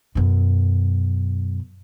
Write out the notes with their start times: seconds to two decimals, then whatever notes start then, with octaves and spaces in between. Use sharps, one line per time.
0.15 F#2 B2